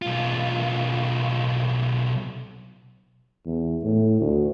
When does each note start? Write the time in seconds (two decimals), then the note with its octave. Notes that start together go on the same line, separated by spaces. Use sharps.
0.02 B1 F4
3.46 E2
3.83 A2
4.20 D2